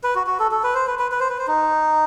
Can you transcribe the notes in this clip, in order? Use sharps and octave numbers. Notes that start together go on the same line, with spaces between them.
B4
F#4
F#4
A4
A4
B4
C5
B4
B4
B4
C5
B4
C5
D#4